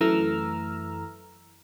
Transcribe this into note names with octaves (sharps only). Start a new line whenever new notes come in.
F#2 E3 A3 A#5 E6 F6